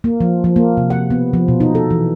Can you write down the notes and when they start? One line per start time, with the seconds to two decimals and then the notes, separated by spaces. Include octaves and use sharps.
0.04 A#3
0.21 F3
0.44 F3
0.56 A#3
0.77 C3
0.90 F#5
1.10 B3
1.33 F3
1.48 B2
1.60 D#4
1.75 A4
1.91 E3